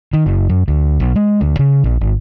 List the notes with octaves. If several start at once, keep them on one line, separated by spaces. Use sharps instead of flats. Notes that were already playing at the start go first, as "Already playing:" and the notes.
D#3
F#1
F#2
D2
B1
G#3
D2
C#3
A#1
G#1